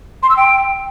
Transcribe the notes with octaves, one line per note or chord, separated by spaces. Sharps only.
C6
E6
G5